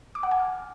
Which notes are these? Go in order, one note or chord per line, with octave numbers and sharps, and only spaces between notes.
D6
F#5
G#5
F6